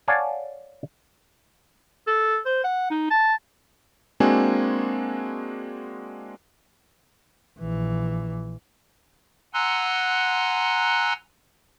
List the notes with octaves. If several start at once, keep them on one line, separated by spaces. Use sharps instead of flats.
C#5 D5 F5 F#5 G#5 A5
A4
C5
F#5
D#4
A5
G#3 A#3 C4 D4 F#4 G#5
A#1 E3
F#5 G#5 A#5 C6 E6 F#6